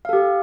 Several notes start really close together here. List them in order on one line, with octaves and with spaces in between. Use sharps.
F5 A4 G4